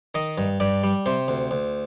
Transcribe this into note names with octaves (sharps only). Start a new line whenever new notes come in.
D#3 D#5
G2
G2 D5
G3
C3 C5
D2
D2